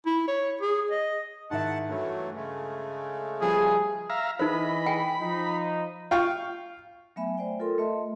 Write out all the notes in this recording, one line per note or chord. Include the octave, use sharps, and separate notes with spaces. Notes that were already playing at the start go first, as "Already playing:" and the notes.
E4
C#5
G#4
D#5
G#2 D#3 E4 F#5 A5
G2 E3 F#3 A3
C#3 G#3 A3
F3 G3 B3 G#4
E5 F5 A#5
E3 D#4 E4 A#4 C5 D#5 B5
G5 G#5
F3 D#4
F4 F5 G5 C#6
F#3 A3 B3 E5 G#5 B5
C5 D5 G5
F4 A4 A#4 C6
A3 D#5 E5 A5 C6